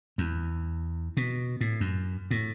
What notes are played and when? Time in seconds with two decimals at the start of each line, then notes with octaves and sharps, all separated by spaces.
0.18 E2
1.17 B2
1.61 A2
1.81 F#2
2.31 A2